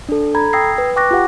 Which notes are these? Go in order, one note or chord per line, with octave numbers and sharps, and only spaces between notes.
D4 A4
A4 A#5 B5 G#6
G5 D#6 E6 G#6 A#6 C7
B4
G5 C#6 D6 F#6 A#6
F4 G4 F#5